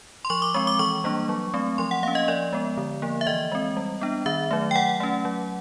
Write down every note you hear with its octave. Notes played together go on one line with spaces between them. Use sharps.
C6
F3 C#6
D6
G#3 C4 C#6
D6
E3 C#6
G3 A#3 D4
F#3
A3 C4
F3 C6
F#5
A#3 C#4 F5
D#5
F3 D5
G#3 B3
D3
F3 A#3
E5
E3 D#5
G#3 C4
G3
B3 D4
D#3 E5
F#3 A3
G5
F#3 F#5
A3 C#4
F#3